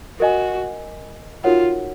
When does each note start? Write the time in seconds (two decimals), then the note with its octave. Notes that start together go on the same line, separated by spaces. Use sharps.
0.20 F#4 A#4 D#5 G#5
1.44 D#4 F4 F#4 A#4 C#5 F#5